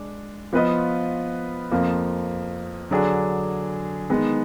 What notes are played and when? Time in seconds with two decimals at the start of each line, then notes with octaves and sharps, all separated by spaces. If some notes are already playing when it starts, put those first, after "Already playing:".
Already playing: G#3 D4
0.53 F3 B3 F4 B4 D#5
1.71 F2 F3 A#3
2.91 D3 F#3 D4 G#4
4.10 D#3 G#3 B3